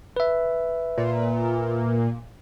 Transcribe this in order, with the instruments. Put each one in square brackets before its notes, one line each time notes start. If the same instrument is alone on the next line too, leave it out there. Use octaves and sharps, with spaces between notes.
[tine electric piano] B4 E5
[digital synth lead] A#2